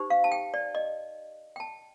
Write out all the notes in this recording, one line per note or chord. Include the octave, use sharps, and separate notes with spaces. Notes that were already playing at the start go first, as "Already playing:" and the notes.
Already playing: D#4 G4 C5
F5
A5
G5
D5
D#5
G5
A5